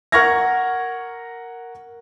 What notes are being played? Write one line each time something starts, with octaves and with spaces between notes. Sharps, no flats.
A#4 F#5 C#6 F6 G#6 A#6